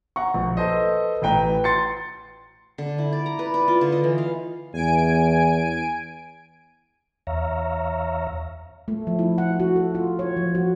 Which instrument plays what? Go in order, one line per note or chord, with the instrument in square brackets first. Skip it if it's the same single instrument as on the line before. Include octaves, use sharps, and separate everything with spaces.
[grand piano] F#5 A#5 C#6
A#1
A4 B4 C5 D#5
A1 B4 G5 A#5
C6 A6 C7 C#7
[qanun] D3
E4
D5
A#5
B4
D5
F4
D3
D#5
E3
F5
[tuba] E2 [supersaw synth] G#5 D7
[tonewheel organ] E2 C#5 E5 F5 A#5
[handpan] A3
F3
E4
F#5
F#4
A4
F4
C#5
F3
F#4